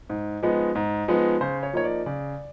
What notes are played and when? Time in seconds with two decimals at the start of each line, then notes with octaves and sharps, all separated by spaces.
0.10 G#2
0.43 F3 G#3 B3 D#4
0.75 G#2
1.08 F3 G#3 B3 D#4
1.41 C#3 C5
1.63 C#5
1.73 F3 A#3 D#4 C#5
1.84 D5
2.06 C#3 D5